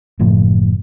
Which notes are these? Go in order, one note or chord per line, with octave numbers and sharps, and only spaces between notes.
F#1 A2 F3